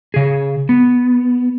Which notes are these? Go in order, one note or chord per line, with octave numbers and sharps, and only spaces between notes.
C#3 G#4
B3